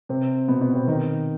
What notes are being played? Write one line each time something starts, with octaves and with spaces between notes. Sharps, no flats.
C3 C4
B2 B3
B2 B3
C3 C4
D#3 D#4